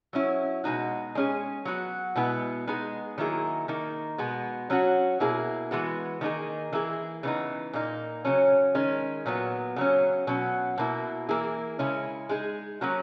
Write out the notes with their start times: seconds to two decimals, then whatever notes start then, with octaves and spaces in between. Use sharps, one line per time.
0.13 F#3 C#4 E4
0.64 B2 G#3 D#4 F#4
1.15 G#3 C#4 G#4
1.65 F#3 B3 F#4
2.16 B2 G#3 B3 E4
2.67 G#3 B3 D#4 G#4
3.18 D#3 F#3 A#3 E4 G#4
3.68 D#3 A#3 D#4
4.18 B2 G#3 B3
4.70 F#3 C#4 F#4
5.20 B2 A#3 E4 G#4
5.71 E3 G#3 B3 F#4
6.21 D#3 A#3 D#4 G#4
6.73 E3 A#3 E4 G#4
7.23 C#3 E3 B3 D#4
7.73 A#2 A#3 D#4
8.25 C#3 F#3 C#4
8.75 D#3 G#3 C#4
9.26 A#2 F#3 B3
9.76 C#3 F#3 C#4
10.27 B2 F#3 C#4
10.78 B2 A#3 E4
11.29 E3 A#3 E4 G#4
11.79 C#3 G#3 C#4 E4
12.29 G#3 D#4 G#4
12.81 F#3 A#3 C#4 F#4